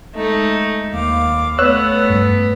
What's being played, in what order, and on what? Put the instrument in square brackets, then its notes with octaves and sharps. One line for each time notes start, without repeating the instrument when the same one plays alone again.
[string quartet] G#3 A3 D#4
D#2 F5 D6
[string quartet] A3 B3 [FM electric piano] C#5 E6 F#6
[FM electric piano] G2